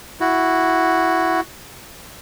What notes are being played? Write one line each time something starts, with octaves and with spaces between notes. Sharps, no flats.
E4 F#4